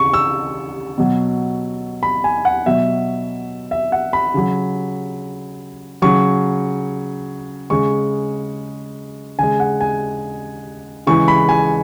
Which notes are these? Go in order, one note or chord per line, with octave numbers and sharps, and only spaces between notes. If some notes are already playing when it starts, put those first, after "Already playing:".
Already playing: C#3 C#6
E6
B2 F#3
B5
G#5
F#5
B2 F#3 E5
E5
F#5
B5
C#3 F#3
C#3 F#3 C#6
C#3 G#3 C#6
C#3 G#3 G#5
F#5
G#5
C#3 E3 G#3 C#6
B5
G#5